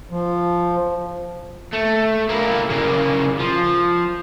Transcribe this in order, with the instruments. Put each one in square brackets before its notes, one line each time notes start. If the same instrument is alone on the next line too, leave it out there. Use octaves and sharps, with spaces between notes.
[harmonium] F3
[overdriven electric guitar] A3
A#3 E4
C#3 A#3
F3